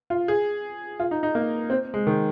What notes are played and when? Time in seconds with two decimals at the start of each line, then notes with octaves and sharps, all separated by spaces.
0.10 F4
0.28 G#4
1.00 F4
1.11 D#4
1.23 D#4
1.35 A#3
1.70 C4
1.94 G#3
2.07 D#3